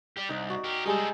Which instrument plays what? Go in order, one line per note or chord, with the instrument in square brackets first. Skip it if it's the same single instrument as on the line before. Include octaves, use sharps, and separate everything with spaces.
[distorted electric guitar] G4 D5
[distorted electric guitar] C2 [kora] D#4 D5
[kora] F#4
[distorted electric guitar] G4 A#4
[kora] G3 G#3 G#4 [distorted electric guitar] D#4 A4